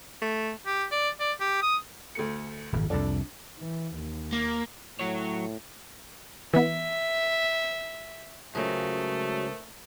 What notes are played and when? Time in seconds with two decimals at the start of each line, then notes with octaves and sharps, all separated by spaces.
0.22 A3
0.66 G4
0.92 D5
1.20 D5
1.40 G4
1.62 D#6
2.15 D2 A3 C#7
2.73 D#1 G#1 F2
2.90 C2 F2 D4 A4 D5
3.58 E3
3.96 D#2
4.33 A#3
4.99 A2 F#3 F#4 C#5
6.54 E3 B3 E5
8.55 C#2 F#3 G#3 A3 C#4 A#4 C5 D#6